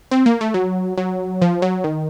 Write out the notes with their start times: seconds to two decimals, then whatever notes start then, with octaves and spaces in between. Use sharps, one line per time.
0.11 C4
0.26 A#3
0.41 A3
0.54 F#3
0.97 F#3
1.42 F3
1.62 F#3
1.84 D#3